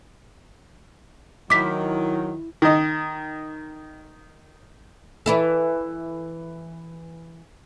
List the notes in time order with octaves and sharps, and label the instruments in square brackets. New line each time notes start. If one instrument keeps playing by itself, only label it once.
[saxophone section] D#3 [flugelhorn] F#3 [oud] E4 [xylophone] D6 B6
[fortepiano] D#3 D#5
[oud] E3 E4 A4